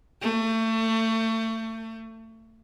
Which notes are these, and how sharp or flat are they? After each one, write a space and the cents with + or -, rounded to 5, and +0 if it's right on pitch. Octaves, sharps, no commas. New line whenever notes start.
A3 +30